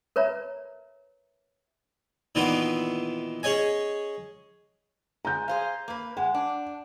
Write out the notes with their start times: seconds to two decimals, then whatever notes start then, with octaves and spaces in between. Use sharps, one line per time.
0.16 A#4 B4 C#5 E5 A#5
2.35 A#2 D#3 E3 B3 D#4 F4
3.43 C#4 G#4 C#5 D#5 G#5
5.25 G#3 A#5 G6
5.48 G#4 C5 F5
5.88 A#3 B4
6.17 G#3 F#5
6.34 D4